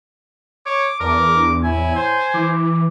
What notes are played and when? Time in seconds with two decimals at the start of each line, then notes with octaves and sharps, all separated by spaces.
0.66 C#5 D6
1.00 E2 G2 E3 A#4 A5 D6
1.33 D4
1.63 A2 E4 G#5
1.96 C5
2.34 E3 D6